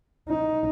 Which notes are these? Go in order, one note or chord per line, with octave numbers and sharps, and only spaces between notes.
D#4